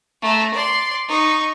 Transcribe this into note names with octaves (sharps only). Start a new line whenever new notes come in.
A3 A#5
D5 C6
D#4 C#6